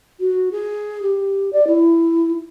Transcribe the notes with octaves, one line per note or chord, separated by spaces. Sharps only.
F#4
G#4
G4
D5
E4